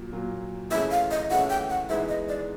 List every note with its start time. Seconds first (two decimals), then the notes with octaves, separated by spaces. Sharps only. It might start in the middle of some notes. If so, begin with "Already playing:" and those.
Already playing: A#2 F#3 A#3
0.13 A#2 F#3 A#3
0.71 E3 A3 C#4 E4 G#4 E5
0.91 F5
1.11 D#5
1.30 E3 A3 C#4 E4 G#4 F#5
1.50 G5
1.70 F#5
1.89 E3 G#3 B3 D#4 E5
2.08 D#5
2.28 D5